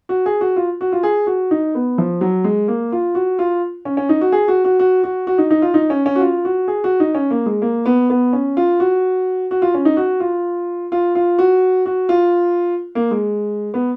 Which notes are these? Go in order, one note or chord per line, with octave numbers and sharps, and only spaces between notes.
F#4
G#4
F#4
F4
F#4
F4
G#4
F#4
D#4
B3
F3
F#3
G#3
A#3
F4
F#4
F4
C#4
C#4
D#4
F#4
G#4
F#4
F#4
F#4
F#4
F#4
D#4
D#4
F4
D#4
C#4
C#4
F#4
F4
F#4
G#4
F#4
D#4
C#4
A#3
G#3
A#3
B3
B3
C#4
F4
F#4
F#4
F4
C#4
D#4
F#4
F4
F4
F4
F#4
F#4
F4
A#3
G#3
B3